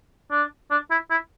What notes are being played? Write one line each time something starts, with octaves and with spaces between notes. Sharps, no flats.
D4
D4
E4
E4